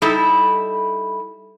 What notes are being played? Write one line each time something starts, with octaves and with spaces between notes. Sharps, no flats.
G3 D#4 E4 A4